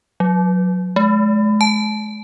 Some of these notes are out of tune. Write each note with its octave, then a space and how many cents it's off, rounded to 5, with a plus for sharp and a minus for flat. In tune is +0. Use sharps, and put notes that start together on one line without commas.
F#3 -25
G#3 +40
A5 -40